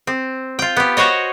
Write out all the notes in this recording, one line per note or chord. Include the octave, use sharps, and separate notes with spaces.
C4
F4 G5
B3 G4
F#4 C5 C#5 D#5